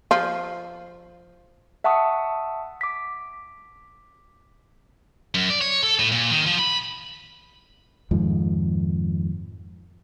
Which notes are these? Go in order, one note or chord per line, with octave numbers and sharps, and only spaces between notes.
F3 F4
E5 F#5 A5 C#6 D#6
D6 B6
F#2
D5
C#5
A4
A2
A#2
D#3
F3
B5
F2 G#2 D#3 F3